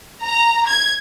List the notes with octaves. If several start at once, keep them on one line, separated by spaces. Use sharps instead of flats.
A#5
G#6